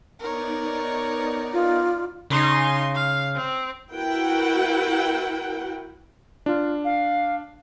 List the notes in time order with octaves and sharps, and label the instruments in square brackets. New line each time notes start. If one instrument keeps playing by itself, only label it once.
[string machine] B3 D#4 D5 [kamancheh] A#4 C#5
[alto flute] F4
[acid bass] C#3 [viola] D#4 C6
[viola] F5
C4
[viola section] E4 F#4 A#4 B4 F#5 G5
[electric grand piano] D4 [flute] F4
[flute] F5